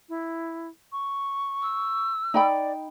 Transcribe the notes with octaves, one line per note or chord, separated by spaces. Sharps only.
E4
C#6
E6
D#4 D5 G5 B5